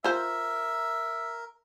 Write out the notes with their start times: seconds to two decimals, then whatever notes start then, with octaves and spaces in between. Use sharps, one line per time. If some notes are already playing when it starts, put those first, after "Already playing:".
0.04 F4 A#4 C5 E5